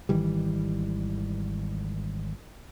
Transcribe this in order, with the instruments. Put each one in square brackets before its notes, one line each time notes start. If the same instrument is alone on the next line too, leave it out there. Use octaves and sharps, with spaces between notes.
[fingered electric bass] G#1 D#3 E3 G3